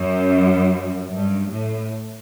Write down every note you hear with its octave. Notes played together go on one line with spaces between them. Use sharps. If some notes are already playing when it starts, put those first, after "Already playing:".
Already playing: F#2
G2
A2